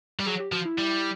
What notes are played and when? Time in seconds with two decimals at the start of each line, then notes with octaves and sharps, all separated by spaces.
0.20 G3
0.26 F#3 G#4
0.40 G4
0.52 F3 F#4
0.65 E4
0.78 G3